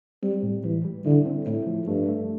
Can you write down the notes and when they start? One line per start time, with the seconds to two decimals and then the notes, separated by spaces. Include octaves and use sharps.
0.23 G3 C4
0.43 A2
0.64 E3 G3
0.85 G3
1.05 D3 E4
1.26 C4
1.46 A2 E4
1.67 F3
1.88 G2 A3
2.09 A3